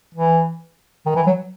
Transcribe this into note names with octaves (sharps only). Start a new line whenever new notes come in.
E3
D#3
E3
F#3